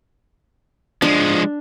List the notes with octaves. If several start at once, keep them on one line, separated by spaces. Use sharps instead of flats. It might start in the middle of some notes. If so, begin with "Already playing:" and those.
F3 G#3 D4